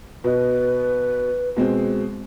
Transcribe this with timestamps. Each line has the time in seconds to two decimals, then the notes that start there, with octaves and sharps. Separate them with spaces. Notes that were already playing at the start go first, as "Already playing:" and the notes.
0.24 B2 B4 D#5
1.57 B2 G#3 C4